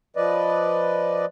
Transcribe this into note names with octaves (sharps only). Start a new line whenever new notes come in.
F3 B4 D5 D#5